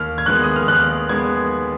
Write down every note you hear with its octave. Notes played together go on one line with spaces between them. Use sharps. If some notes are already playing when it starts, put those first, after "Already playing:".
Already playing: D#2 F6
G#6
D#3 G#3 B3 F#6
D#6
F6
D#2 F#6
D#3 G#3 B3 G#6